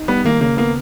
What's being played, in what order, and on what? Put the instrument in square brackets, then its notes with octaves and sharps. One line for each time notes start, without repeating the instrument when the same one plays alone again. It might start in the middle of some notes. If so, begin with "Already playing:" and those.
Already playing: [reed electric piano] D#4
[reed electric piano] G3 [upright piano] B3
[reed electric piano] D#3 [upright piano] A#3
[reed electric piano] C#3 [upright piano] A#3
[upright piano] A#3 [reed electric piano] B3